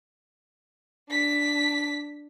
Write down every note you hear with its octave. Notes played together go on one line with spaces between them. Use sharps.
D4 B6